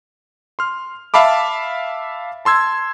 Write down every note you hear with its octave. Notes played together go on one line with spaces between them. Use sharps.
C6 F6
E5 F5 A5 B5 D6
A5 C6 E6 G#6